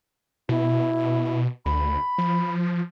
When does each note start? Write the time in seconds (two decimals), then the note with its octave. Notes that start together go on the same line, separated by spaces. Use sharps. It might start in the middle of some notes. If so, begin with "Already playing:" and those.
0.49 B2 E4
1.66 D2 B5
2.18 F3